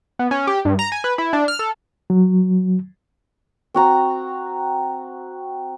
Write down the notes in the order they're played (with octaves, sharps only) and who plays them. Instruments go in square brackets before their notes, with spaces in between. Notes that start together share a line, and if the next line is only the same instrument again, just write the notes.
[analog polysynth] B3
C#4
G4
G2
A#5
G#5
B4
E4
D4
F6
A4
[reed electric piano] F#3
[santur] C4 F#4 A#5